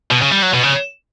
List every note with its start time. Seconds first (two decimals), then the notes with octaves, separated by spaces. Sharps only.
0.11 B2
0.22 C#3
0.32 G3
0.42 F#3
0.54 B2
0.63 C#3